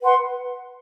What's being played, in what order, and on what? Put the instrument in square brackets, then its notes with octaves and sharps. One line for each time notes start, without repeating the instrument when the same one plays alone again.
[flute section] B4 F#5 C6